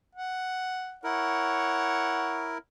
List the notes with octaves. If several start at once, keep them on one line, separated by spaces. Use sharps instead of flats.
F#5
E4 A#4 C#5 F#5